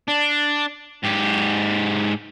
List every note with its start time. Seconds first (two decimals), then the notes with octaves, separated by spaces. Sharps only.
0.08 D4
1.03 G#2 G4